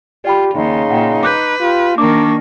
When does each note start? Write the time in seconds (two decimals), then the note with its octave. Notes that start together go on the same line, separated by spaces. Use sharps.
0.25 F4 G4 D5 G5 B5
0.54 D#2 C#3 D#4 C6
0.91 A#2 F#5 G5
1.23 B4 D6 F#6 G6
1.60 F4 G4
1.98 D#3 A#3 D4 A#4 C#6 D6